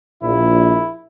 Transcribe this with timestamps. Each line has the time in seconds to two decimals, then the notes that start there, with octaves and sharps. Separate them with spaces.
0.23 A#1 E4